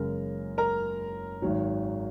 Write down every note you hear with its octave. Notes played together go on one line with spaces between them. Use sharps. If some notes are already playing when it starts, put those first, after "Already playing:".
Already playing: F#1 F#2 C#3 G#3 A#4
A#4 A#5
G#1 G#2 D#3 F#3